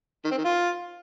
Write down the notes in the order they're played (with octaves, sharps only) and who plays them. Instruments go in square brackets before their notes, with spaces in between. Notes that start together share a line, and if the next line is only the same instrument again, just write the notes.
[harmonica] D#3
C4
D#3
F4